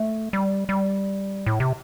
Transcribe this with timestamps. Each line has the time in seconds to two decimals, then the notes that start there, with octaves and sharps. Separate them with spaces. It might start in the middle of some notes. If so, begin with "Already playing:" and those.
Already playing: A3
0.33 G3
0.69 G3
1.47 A2
1.60 C3